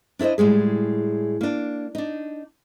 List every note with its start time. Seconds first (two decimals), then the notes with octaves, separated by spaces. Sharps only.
0.19 D4 E4 A4 C5 D#5
0.38 A2 G3 G#3 G#4
1.41 A#3 D4
1.95 D4 D#4